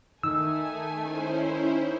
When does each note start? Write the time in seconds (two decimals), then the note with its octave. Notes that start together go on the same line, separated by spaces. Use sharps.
0.23 D#3 A3 D#4 G#5 E6
1.00 C#4 E4 C5